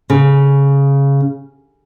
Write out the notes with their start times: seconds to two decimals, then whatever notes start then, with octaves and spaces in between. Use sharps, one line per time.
0.10 C#3